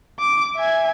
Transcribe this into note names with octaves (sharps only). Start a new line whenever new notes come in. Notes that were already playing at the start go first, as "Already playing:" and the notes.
D6
E5 G#5